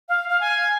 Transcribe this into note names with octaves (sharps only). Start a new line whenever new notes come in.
F5
F5
G#5